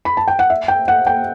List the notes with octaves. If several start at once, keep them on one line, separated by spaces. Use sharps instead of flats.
B5
A5
G5
F#5
E5
G5
F#5
G5